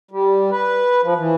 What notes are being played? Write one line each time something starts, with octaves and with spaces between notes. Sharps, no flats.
G3
B4
F3
E3